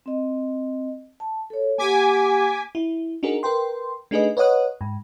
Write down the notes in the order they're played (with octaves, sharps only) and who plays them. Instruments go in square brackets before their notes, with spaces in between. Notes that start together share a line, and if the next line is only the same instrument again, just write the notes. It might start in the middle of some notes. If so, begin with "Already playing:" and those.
[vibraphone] C4 D#5
A5
A4 C#5
[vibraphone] A#3 G4 F#5 [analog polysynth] G#5 D6 B6
[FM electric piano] E4
D4 D#4 F#4 G#4 A#4
A#4 B4 G5 C6
A3 D4 D#4 G#4 B4 D#5
B4 C#5 D#5 F#5 D#6 F#6
G#2